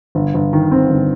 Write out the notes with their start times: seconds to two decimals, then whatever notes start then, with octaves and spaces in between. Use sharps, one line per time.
0.15 G1
0.34 G1
0.53 D#3
0.71 C4
0.90 G1